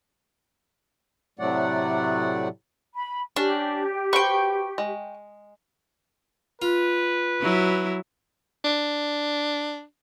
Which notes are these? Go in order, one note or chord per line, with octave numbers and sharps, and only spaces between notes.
A2 C3 F#3 A3 D5 F#5
B5
C#4 D4 G4
F#4 B4 C5 G5 C#6
G#3
F4 B4
F#3 E4
D4